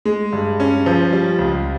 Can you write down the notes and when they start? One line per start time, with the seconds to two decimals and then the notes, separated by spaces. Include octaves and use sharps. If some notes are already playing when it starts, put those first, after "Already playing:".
0.05 G#3
0.33 G2
0.60 C#4
0.86 F3
1.12 G3
1.39 C#2